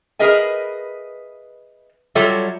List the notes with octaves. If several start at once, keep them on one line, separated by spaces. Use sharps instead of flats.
G#4 A#4 B4 D#5 E5 G#5
F#3 G3 F4 A4 C#5 E5